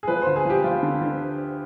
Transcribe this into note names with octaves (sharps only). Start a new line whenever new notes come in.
G#4
F3 B4
D2 C5
G#4
F3 G4
F3 F4
D3
D3